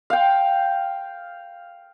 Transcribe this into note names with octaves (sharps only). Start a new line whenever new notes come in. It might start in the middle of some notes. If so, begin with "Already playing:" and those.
F5 G5